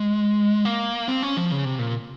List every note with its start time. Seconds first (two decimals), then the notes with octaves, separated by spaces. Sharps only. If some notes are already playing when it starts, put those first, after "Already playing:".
Already playing: G#3
0.65 A#3
1.08 C4
1.23 C#4
1.37 F3
1.51 C#3
1.65 C3
1.79 A#2